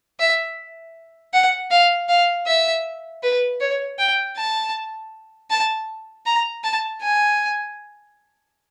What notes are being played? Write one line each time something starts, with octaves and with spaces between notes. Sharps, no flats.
E5
F#5
F5
F5
E5
B4
C#5
G5
A5
A5
A#5
A5
G#5